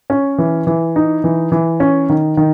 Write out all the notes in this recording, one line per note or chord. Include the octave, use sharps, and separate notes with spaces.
C#4
E3
E3
D#4
E3
E3
C#4
D#3
D#3